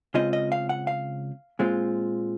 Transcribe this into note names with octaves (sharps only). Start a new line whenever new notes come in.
C#3 G#3 C4 F4 D#5
D#5
F5
F#5
F5
A#2 G#3 C4 F4